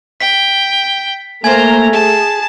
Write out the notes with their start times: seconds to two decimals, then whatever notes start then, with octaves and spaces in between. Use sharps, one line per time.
0.20 G5 B6
1.44 A3 A#3 C5 G#5 A#5 G#6
1.93 G#4 A5